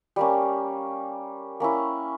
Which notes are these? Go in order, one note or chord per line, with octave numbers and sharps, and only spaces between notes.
G3 A#3 C#4
A#3 C#4 E4